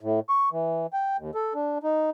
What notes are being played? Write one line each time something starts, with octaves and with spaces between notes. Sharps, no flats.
A2
C#6
E3
G5
D#2
A4
D4
D#4